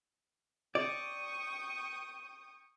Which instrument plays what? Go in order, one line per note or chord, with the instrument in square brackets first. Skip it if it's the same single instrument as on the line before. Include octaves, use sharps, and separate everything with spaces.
[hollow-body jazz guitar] D5 [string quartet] G5 C#6 D#6